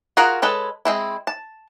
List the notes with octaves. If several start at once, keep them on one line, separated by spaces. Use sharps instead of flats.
F4 F#4 G#4 A#4 F#5
G#3 A4 B4 C#5
G#3 C4 E4
A5